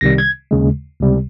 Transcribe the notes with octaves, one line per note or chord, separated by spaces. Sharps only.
C2 C3 D#3 G3 A#6
G#6
D#2 C#3 G#3
C#2 C3 G3